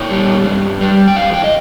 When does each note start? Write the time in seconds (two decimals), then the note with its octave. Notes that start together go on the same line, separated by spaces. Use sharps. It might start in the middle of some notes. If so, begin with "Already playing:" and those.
Already playing: A#2 C#5
0.11 G3
0.46 G2
0.81 G3
1.08 G5
1.16 F2 F5
1.34 G5
1.44 D#5